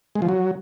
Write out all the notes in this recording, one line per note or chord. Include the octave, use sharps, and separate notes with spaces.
G#3
F3
F#3